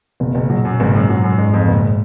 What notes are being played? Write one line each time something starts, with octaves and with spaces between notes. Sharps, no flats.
F#1 B2
F#1
A#2 F#3
F#2
F#1 G#2
F#2
F#3
F#2
G#2 G#3
F2
F#1 A#2